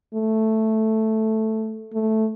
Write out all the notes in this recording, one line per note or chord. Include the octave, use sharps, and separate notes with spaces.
A3
A3